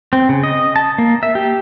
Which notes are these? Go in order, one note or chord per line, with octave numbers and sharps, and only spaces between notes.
C4
C#3
D#5
A5
A#3
E5
G4